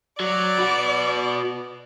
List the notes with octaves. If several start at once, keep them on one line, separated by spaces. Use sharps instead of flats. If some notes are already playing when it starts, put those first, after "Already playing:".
F#3 D5
F#4 B4